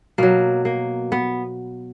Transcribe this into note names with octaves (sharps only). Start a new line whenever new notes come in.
B2 F#3 A#3
A#3
B3